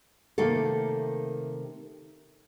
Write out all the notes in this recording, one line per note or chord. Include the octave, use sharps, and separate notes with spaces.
C3 D#3 A3 A#3 A4